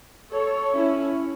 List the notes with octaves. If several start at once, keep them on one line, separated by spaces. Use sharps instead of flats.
A4 C#5
C#4 E4